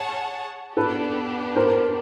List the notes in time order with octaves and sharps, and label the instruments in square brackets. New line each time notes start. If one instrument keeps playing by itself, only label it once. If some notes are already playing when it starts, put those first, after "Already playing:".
Already playing: [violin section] G#4 C#5 F#5 A5
[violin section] B3 D4 G4 [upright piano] A4 B4
[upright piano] A#4 C5